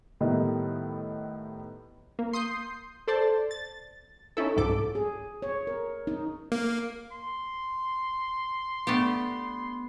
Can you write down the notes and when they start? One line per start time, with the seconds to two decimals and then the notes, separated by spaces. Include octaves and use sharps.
0.21 A2 D#3 G3 B3 D#4 E4
2.19 A#3
2.33 C6 D#6 G6 C7
3.08 A4 C5 D5 A5
3.51 A6
4.37 C#4 D#4 E4 A4
4.57 C2 F2 G#2 A4 D6
4.95 G#4
5.42 C#5
5.67 A#4
6.07 D#4
6.52 A#3
7.12 C6
8.87 A3 B3 D4 G4